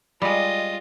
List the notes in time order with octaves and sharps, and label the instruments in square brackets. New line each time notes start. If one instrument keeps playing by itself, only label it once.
[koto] G3 G#3 [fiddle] F4 D#5